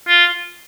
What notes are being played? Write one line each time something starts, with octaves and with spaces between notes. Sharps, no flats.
F4